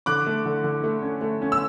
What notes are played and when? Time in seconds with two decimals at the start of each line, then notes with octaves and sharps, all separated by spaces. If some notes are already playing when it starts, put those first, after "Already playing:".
0.06 D3 D6 F#6
0.27 A3
0.46 D3
0.64 D3
0.84 A3
1.02 C#4
1.21 A3
1.42 C#4
1.52 E6